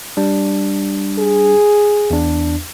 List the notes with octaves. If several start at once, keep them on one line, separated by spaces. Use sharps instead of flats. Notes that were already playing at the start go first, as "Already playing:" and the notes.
G3 D4
G#4
E2 D4